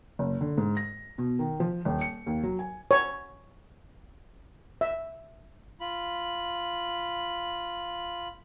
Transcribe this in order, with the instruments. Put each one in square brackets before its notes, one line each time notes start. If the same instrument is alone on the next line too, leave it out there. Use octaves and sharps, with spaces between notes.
[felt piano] F#1
D3
G#2
A#6
B2
D#3
F3
D#1
C#7
D#2
F#3
G#5
[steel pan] C#5
E5
[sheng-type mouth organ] F4 B5